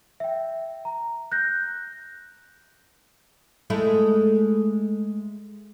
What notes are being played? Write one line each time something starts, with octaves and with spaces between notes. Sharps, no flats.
E5 G5
A#5
F#6 G6 A#6
G#3 A3 E4